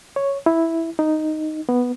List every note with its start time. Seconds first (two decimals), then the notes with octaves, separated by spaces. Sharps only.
0.16 C#5
0.46 E4
0.99 D#4
1.69 B3